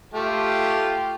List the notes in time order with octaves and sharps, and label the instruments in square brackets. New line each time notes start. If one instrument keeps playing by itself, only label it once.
[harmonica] A3 [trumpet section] F4 G4